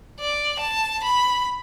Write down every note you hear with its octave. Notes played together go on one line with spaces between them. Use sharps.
D5
A5
B5